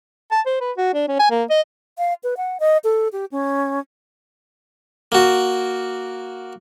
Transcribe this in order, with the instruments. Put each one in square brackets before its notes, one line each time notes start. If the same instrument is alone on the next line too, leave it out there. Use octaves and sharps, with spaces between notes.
[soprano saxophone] A5
C5
B4
F#4
D4
C#4
G#5
A#3
D#5
[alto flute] F5
B4
F#5
D#5
A4
G4
C#4
[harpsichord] A#3 F#4